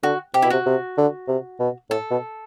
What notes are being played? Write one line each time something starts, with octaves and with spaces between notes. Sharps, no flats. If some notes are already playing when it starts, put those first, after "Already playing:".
D3 F#4
C3 G4
B2 E4
C3 F#4
C3
D3
C3
B2
A2 A4
B2